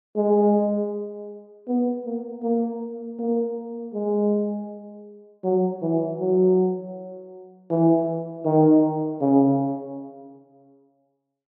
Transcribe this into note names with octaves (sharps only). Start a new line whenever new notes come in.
G#3
B3
A#3
A#3
A#3
G#3
F#3
E3
F#3
E3
D#3
C#3